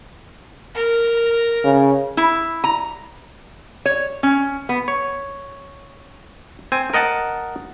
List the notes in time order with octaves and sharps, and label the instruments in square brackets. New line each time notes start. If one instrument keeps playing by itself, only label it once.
[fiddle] A#4
[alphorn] C#3
[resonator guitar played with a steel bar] E4
A#5
C#5
C#4
B3
[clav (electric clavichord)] C#5
C4 G#5
A#4 D#5 F#5 A5